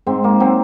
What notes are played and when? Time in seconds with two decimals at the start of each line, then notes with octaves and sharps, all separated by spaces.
0.06 G#2 C4
0.24 A#3
0.40 F#3 C4